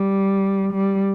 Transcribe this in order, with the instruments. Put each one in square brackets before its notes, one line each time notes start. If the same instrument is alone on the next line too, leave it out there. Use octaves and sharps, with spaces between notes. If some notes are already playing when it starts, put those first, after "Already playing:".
Already playing: [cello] G3
G3